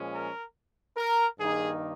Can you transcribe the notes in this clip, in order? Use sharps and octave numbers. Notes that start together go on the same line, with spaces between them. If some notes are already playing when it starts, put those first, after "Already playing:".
Already playing: A#2 F3 G#3 C#4
A#4
A#4
G2 D#3 A#3 D#4 G#4